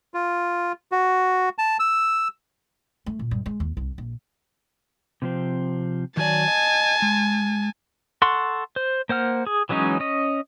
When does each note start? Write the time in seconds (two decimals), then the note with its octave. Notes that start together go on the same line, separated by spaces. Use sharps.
0.14 F4
0.92 F#4
1.58 A5
1.80 E6
3.06 A3
3.19 A#2
3.31 G2
3.46 G#3
3.60 D#2
3.77 C2
3.98 A#1
5.22 C3 F3 C4
6.17 D#3 F#3 D5 G#5 A5
6.48 D#5
7.02 G#3
8.22 A4 F#5 C6 C#6
8.76 C5
9.09 A#3 C5 F#5 F6
9.47 G#4
9.69 E3 F#3 G#3 C#4 D#4
10.00 C#4 D#5